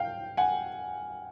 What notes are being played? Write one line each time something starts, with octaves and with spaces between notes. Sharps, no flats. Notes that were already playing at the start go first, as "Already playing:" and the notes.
Already playing: F5 G5
F#5 G#5